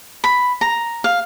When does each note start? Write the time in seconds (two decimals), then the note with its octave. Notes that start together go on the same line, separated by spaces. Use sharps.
0.24 B5
0.61 A#5
1.04 F5